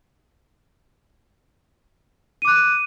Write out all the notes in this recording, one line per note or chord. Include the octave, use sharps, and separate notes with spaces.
D6 F#6 D#7